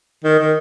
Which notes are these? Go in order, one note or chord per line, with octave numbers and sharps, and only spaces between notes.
D#3
D#3